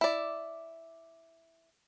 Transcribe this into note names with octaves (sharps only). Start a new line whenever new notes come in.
E4 D5